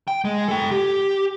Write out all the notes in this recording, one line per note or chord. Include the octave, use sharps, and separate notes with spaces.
G5
G#3
A4 G5
G4